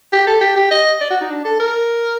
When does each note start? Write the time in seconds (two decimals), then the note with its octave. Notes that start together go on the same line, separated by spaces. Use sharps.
0.13 G4
0.27 A4
0.41 G4
0.56 G4
0.71 D#5
1.01 D5
1.11 F#4
1.21 D#4
1.30 D4
1.45 A4
1.60 A#4